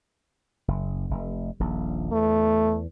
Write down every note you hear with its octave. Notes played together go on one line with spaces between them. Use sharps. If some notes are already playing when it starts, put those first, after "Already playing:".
F#1
F1
D#1 A#1
E2 A3